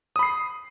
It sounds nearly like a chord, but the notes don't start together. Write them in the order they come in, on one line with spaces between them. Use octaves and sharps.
D#6 B5 C7